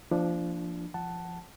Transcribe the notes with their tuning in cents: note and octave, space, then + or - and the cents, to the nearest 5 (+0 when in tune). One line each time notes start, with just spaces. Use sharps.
F3 -20 A#3 +0 D4 +0
F3 -20 F#5 +15 A5 +5